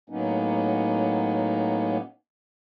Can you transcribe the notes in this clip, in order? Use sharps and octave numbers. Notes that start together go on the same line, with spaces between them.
A2 F#3 A#3 B3 C#4 D#4